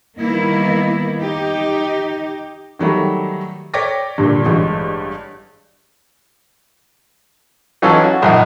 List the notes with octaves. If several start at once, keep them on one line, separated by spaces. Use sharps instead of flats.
D#3 G3 A#3 B3 D#4 E4
D#4 G4
D#3 F#3 G3 A3
C#5 D5 G5 D6 A#6 B6
G2 A#2 D3
A1 G2 G#3
E3 F#3 C#4 D#4 F4 A4
F#4
A#1 F#2 D#4